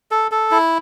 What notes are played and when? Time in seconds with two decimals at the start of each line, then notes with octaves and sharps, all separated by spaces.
0.11 A4
0.31 A4
0.51 E4